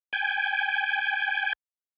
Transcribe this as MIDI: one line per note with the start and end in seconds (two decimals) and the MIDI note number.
0.13 1.53 79
0.13 1.53 80